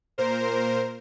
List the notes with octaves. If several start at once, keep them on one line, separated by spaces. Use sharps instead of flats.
A#2 A#4 C5